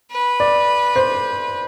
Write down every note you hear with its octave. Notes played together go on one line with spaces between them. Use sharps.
B4
D5
C5